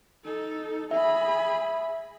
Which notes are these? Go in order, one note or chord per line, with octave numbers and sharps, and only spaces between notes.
D#4 A4
G#4 E5 B5